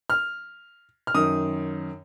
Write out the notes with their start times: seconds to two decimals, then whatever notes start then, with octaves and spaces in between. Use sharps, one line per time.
0.10 F6
1.07 F6
1.15 F#2 D#3 D#6